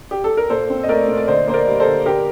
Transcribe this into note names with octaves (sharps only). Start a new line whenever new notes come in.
G4
A4
A#4
A#2 A4 C5
C4
D#5
A3 A#4 D5
A#2
D5
D3 C5 D#5
A#3 C5
A#4 D5
G3
A4 C5
D3
D3 G4 A#4